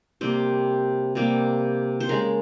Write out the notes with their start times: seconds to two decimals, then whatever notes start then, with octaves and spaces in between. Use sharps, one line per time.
0.21 C3 G3 A#3 C5
1.15 C3 G3 A#3
2.00 C5
2.09 C#3 G#3 A#4